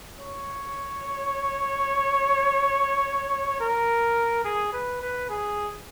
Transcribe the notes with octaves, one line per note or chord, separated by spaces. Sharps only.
C#5
A#4
G#4
B4
B4
G#4